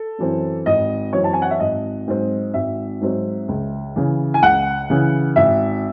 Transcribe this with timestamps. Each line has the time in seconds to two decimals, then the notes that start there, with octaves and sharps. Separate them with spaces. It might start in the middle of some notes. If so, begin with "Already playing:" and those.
Already playing: A4
0.18 F#2 E3 C4
0.66 G#1 D#5
1.13 F#2 E3 C4 C#5
1.24 A5
1.33 G#5
1.42 F#5
1.51 E5
1.60 G#1 D#5
2.08 G#2 F#3 C4
2.54 G#1 E5
3.01 G#2 F#3 C4
3.48 C#2
3.96 C#3 E3
4.34 G#5
4.42 C#2 F#5
4.90 C#3 E3
5.36 G#1 E5